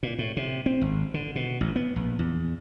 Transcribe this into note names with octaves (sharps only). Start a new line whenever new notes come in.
A#2
A2
C3
C4
G#1
D3
B2
A1
B3
A#1
E2